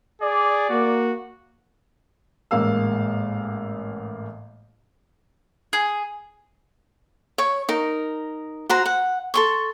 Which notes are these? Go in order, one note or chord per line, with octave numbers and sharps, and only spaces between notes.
G#4 D5
A#3 F#4
A1 G#2 A#3 F5 E6
G#4
C#5 C#6
D#4 A#4
F#4 C5 A#5
F#5
A4 C6 C#6